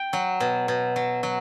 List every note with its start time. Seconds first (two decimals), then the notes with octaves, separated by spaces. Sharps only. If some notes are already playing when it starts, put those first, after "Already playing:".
Already playing: G5
0.13 F#3
0.40 B2
0.68 B2
0.96 F#3
1.23 F#3